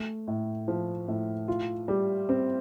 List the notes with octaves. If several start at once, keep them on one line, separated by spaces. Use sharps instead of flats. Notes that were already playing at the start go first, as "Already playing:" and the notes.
Already playing: A3
A2
F3
A2
F4
G3
C4